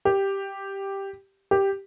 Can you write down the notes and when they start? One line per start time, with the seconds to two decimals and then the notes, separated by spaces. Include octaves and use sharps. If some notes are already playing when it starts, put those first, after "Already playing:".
0.05 G4
1.51 G4